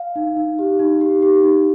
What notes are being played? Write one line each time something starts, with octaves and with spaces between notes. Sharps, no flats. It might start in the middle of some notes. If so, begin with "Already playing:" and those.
Already playing: F5
D#4
D#4
G4
D#4
G4
G4
D#4